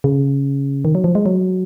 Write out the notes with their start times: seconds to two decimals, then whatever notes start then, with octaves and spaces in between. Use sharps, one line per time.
0.04 C#3
0.85 D#3
0.95 F#3
1.04 F3
1.15 G#3
1.26 F#3